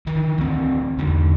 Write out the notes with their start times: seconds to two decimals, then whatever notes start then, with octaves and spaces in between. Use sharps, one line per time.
0.07 D#3 E3
0.38 D2 C4
0.98 E2 D3